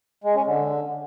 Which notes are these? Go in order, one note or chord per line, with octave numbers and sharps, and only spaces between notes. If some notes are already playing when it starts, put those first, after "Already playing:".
G#3
C#4
D3